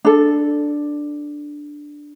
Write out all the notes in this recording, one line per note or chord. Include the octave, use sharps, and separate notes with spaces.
D4 A4